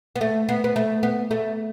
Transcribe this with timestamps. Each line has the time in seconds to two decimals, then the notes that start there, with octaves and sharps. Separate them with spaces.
0.16 B3
0.21 A3
0.49 B3
0.64 B3
0.76 A3
1.03 B3
1.31 A3